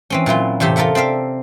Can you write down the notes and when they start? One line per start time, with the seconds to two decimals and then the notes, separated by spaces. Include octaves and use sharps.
0.10 E3 C4 C#4
0.26 A#2 F#3 E4 F4
0.60 E2 A2 C3 G4 E5
0.76 F4 A4 A#4 E5 F#5
0.95 C4 D5 E5 F5